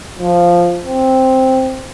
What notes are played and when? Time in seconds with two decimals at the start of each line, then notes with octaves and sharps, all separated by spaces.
0.19 F3
0.85 C4